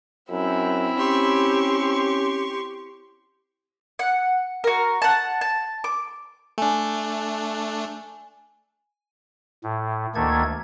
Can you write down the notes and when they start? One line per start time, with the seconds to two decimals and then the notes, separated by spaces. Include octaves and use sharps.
0.30 F#2 C4 E4
0.97 C#4 G4 C6 C#6
3.99 F#5
4.64 F#4 A#4
5.02 F#5 A5
5.41 A5
5.84 D6
6.58 A3 D4 G#5
9.63 A2
10.15 D2 D#3 A3 A#3 A4 G#6